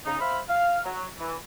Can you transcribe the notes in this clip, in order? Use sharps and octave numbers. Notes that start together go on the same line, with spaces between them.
C#3 D#4
C5 E5 F5 B5
F5
F#3
E3